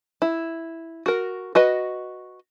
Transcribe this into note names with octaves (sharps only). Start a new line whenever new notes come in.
E4
F#4 A#4
F#4 B4 D#5